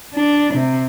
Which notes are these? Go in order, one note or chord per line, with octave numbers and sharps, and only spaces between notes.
D4
C3